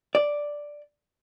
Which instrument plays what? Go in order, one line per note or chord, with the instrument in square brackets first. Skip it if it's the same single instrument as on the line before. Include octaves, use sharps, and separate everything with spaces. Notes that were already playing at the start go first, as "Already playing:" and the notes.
[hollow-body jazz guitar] D5